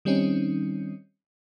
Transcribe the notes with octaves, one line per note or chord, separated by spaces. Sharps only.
D#3 G3 C4 C#4 D#4